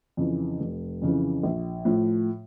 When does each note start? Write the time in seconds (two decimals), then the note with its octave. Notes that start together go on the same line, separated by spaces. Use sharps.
0.17 F2 C#3 E3
0.60 F1
1.02 F2 C#3 E3
1.43 A#1
1.85 A2 F3